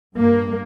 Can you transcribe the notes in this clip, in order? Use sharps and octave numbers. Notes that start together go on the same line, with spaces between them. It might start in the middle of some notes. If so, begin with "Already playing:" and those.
G2 A#3